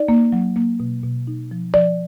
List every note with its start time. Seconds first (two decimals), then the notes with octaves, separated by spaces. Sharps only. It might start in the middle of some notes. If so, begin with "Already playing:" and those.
Already playing: D#4 D5
0.08 A#3
0.32 F#3
0.56 A#3
0.80 B2
1.04 B2
1.27 D#4
1.51 F3
1.74 F3 D5